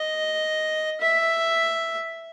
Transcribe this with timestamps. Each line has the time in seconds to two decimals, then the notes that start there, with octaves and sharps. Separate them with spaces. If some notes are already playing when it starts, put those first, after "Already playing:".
Already playing: D#5
1.01 E5